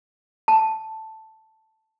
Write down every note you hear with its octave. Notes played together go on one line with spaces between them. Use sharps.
A5